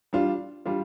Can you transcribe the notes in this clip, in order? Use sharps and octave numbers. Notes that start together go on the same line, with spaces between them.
G3 D4 F4
G3 D4 F4